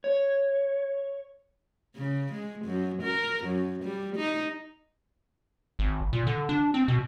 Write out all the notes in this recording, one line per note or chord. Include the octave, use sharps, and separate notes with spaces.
C#5
C#3
G#3
F#2
A#4
F#2
G3
D#4
G#1
A#2
D3
D4
C4
B2